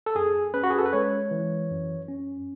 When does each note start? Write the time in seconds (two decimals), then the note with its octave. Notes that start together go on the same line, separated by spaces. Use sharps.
0.06 A4
0.15 F#2 G#4
0.54 C#4 B4
0.63 F#4
0.70 G#4
0.78 A4
0.86 B4
0.93 G#3 C#5
1.31 E3
1.71 F#2
2.08 C#4